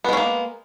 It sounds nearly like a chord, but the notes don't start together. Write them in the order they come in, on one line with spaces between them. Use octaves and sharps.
B3 G#3 C#4 A#3